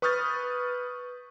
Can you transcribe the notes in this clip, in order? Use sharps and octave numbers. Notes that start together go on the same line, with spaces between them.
B4 C#6 D#6 F6 G6 A6